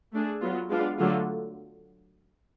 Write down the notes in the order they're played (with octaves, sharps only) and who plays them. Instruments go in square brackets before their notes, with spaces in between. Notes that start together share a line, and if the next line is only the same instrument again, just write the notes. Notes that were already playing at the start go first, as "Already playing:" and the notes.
[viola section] A3 D4 G#4
F#3 B3 F4
G#3 B3 D4 F4
D3 F#3 A3 F4